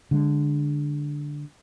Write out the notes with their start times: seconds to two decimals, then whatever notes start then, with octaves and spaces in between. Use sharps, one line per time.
0.11 D3 G#3